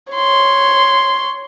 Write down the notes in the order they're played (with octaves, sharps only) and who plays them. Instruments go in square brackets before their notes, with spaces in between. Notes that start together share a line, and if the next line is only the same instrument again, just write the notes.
[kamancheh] C#5 C6